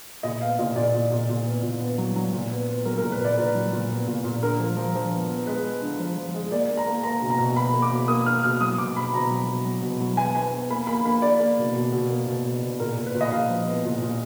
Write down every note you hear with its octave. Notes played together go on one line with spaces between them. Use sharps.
A#2 D#5
B3 F5
A#2 D#5
A#2 D5
A#2
A#2
A#2
B3
A#2
B3
F#3
F#3
A#2
B3
B3
F#3 A#4
A#4
A#2
B4
A#2 D5
A#2 B4
F#3
A#2
B3
A#2
A#2
D3 A#4
F3
F3
F3
B3
B3
G#3 B4
B3
D3
F3
F3
G#3
A#3 D5
A#3
A#5
A#3
A#3 A#5
B2
A#5
B2
B2 B5
A#3
D6
B2
A#3 D#6
A#3 F6
B2 F6
F#3 D#6
B2 D6
B2 B5
B2 A#5
F#3
B2
F#3
B2
F#3
B3 G#5
B3 G#5
B3
A#3 B5
A#3 B5
A#3 B5
A#3 D5
A#3
B2
B2
B2
A#3
B2
B2
B2
A#2 A#4
A#2
B4
A#2
D#5
A#2 F5
F3
B3
A#2
A#2